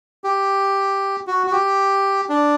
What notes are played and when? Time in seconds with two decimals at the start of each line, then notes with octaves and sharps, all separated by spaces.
0.24 G4
1.27 F#4
1.47 F#4
1.52 G4
2.29 D4